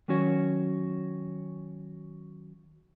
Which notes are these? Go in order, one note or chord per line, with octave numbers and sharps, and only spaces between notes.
D#3 F#3 C#4 F#4 C#5